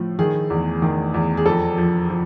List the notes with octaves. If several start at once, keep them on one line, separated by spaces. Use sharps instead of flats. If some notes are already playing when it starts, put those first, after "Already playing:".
Already playing: A2 F3
D#3 G#4
E2
D#3
E2
G#4
F2 A4
F3
F3